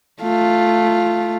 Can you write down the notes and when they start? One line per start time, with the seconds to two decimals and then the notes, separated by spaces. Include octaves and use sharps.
0.21 A3 F4